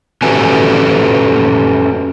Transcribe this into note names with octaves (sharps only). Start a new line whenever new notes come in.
C#4 F#4 G4 A4 B4 G#5